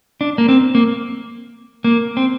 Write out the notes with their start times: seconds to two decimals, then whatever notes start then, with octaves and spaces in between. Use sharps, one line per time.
0.21 D4
0.38 A#3
0.49 C4
0.75 A#3
1.84 A#3
2.17 C4